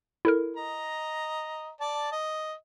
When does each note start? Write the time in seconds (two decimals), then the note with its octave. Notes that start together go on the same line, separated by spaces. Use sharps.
0.25 E4 A4 A#4
0.56 D#5 A#5
1.81 D5 A5
2.12 D#5